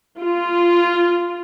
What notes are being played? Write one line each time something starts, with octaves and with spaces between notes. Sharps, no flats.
F4